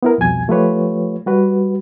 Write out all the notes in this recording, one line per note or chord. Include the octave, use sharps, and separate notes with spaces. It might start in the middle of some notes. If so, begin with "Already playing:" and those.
B3 E4 A#4
C2 F2 B2 G#5 G#6
F3 A3 F4 G4 B4 C#5
G3 F#4 B4